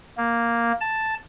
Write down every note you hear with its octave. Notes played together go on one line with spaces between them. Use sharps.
A#3
A5